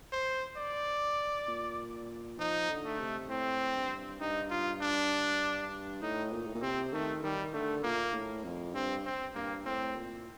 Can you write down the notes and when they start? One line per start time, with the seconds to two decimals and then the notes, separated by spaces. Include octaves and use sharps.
0.13 C5
0.57 D5
1.48 A#2
2.39 F3 D#4
2.69 D3
2.85 A3
3.00 C3
3.29 A2 C4
3.75 G2
4.20 G2 D#4
4.51 F4
4.82 D4
6.02 A2 D#4
6.33 A#2
6.47 A2
6.55 A#2
6.62 C3 C4
6.93 D#3 A3
7.23 D#3 G3
7.53 D3 A3
7.84 A#2 A#3
8.14 A2
8.44 F2
8.75 G2 C4
9.06 C4
9.35 G2 A#3
9.65 A2 C4
9.95 A#2